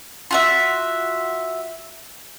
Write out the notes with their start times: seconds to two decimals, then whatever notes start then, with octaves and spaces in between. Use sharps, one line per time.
0.31 F4 F#4 E5